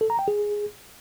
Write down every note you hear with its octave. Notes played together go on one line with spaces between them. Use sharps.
A4
A#5
G5
G#4